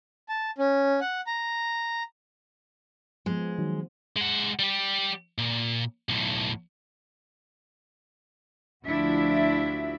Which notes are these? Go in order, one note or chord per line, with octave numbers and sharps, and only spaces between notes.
A5
C#4
F#5
A#5
F3 G#3 B3
D#3 F#3
G#3 F#5
G3 G4
A#2
B1 A2
D2 F3 D4 E4 F#4 E5